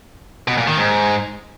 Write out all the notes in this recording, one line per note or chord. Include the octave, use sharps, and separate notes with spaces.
B2
A#2
D#3
G#2